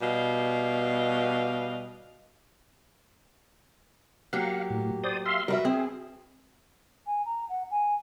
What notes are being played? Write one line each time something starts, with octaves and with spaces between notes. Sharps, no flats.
B2 G3 D#5 F5
F#3 A#3 G4 F5 F#5
A2
C5 D5 D#6
E5 F5 C6
G3 F#4 A#4 B4 E5
C4 G#4
G#5
A#5
F#5
G#5